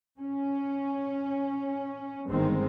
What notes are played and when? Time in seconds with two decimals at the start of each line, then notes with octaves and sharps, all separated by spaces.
0.20 C#4
2.27 G1 G#2 D#3 G#3 C4